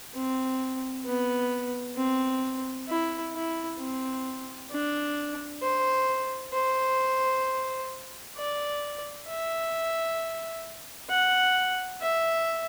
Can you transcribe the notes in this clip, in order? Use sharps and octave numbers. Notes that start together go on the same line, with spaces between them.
C4
B3
C4
E4
E4
C4
D4
C5
C5
D5
E5
F#5
E5